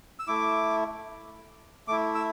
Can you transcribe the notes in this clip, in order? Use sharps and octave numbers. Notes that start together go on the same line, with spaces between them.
E6
A3 E4 D6
A3 E4 D6
E6